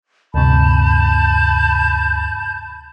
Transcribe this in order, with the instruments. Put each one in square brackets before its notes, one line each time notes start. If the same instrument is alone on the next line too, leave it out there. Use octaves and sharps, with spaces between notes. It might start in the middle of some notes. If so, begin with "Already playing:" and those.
[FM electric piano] D2 G2 C3 [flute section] A5 B5 G6